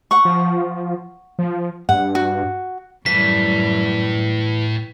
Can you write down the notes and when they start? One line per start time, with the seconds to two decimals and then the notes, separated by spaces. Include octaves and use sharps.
0.11 F#5 C#6
0.25 F3
1.39 F3
1.89 G2 F#5
2.15 F#4
3.06 F#2 A2 E3 G3 B6